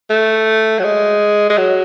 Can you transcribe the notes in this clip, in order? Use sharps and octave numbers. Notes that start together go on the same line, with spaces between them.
A3
F#3
G#3
G#3
F#3